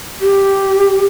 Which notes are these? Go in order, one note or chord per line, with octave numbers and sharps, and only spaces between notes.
G4